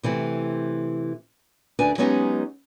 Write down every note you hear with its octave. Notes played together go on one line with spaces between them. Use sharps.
C3 E3 A3 C4
D2 D4 B4 G#5
F#3 G#3 B3 C#4 D#4 G4